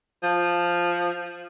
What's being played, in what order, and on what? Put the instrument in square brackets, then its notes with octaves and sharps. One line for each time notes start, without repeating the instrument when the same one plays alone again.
[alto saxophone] F3